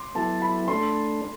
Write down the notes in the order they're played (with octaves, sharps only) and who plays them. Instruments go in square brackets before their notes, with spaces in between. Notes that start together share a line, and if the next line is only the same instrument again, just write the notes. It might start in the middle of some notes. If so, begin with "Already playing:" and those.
Already playing: [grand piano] C6 D6
[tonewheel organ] F#3 B3 E4 A4 [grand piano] A5
[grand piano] B5
[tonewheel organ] A3 D4 A4 [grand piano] C6